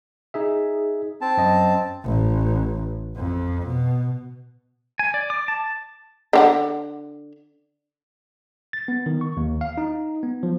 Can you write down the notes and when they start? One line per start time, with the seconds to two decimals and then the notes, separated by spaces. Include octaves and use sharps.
0.34 D#4 G#4 E5
1.21 C4 A5
1.37 F#2 D#5
2.04 A1
3.16 F2
3.66 B2
4.99 G#5
5.14 D5
5.30 D6
5.48 A5
6.33 D3 G4 F#5
8.73 A6
8.88 B3
9.06 D#3
9.21 C#6
9.37 D#2
9.61 F5
9.78 D#4
10.23 B3
10.43 F3